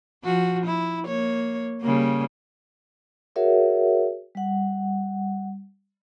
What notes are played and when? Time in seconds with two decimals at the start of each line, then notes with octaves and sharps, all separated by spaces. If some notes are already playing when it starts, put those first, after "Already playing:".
0.24 F3 F#4
0.66 E4
1.07 A#3 C#5
1.82 C#3 G3 A#3
3.36 F#4 G#4 A#4 C#5 E5 F#5
4.35 G3 F#5